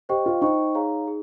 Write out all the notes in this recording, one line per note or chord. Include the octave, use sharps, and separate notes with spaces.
G4 C5 D#5 G5 C#6
F4
D#4 C5 D#5 G5 C#6
G#4 C#5 F5 A#5
G#4